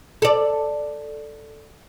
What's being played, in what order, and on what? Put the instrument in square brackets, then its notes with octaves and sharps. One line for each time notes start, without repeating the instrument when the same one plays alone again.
[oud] A4 D5